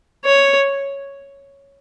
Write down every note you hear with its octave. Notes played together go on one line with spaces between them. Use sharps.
C#5